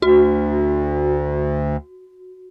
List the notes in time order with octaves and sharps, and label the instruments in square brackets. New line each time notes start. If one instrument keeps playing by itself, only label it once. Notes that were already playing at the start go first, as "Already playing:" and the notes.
[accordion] D2 [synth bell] F#4